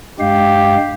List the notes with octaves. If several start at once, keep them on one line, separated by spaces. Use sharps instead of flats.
G2 G#3 G4 F5